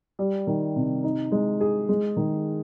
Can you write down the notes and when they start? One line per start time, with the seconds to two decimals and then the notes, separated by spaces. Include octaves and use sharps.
0.19 G3
0.47 D#3
0.76 C3
1.04 D#4
1.32 G#3
1.60 G#4
1.89 G#3
2.17 D#3